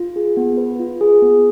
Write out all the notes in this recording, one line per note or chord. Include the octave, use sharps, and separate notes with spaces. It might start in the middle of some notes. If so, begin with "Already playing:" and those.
Already playing: F4
G#4
B3
B4
F4
G#4
B3